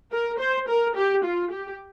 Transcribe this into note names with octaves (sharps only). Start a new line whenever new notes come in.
A#4
C5
A#4
G4
F4
G4